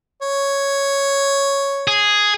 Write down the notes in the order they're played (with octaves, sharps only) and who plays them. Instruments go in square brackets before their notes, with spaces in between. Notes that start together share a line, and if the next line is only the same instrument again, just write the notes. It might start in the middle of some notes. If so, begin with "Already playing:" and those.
[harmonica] C#5
[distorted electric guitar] G#4